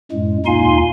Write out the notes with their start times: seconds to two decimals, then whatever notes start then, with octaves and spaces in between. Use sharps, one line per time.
0.12 F#2 A2 G#3
0.46 D#2 A#2 D#4 F5 G#5 C6